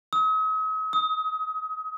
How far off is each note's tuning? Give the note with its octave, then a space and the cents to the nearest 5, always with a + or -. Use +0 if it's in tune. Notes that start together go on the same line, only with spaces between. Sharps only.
D#6 +45
D#6 +25